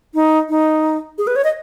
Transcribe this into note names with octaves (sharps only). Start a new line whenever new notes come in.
D#4
D#4
G#4
B4
C#5
D#5